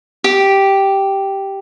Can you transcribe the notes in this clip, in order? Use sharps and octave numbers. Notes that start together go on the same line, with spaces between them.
G4